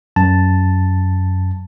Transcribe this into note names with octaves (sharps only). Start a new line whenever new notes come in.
F#2 A5